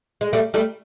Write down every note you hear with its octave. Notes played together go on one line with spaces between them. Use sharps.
G#3
G3 A3
G3 A3